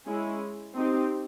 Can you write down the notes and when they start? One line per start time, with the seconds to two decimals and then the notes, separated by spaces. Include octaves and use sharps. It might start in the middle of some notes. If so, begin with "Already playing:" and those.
0.08 G#3 C#4 E4
0.75 C4 D#4 G4